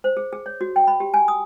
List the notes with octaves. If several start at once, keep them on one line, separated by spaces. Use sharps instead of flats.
C5
G#4
G#4
C#5
F#4
G5
B5
G4
G#5
D#6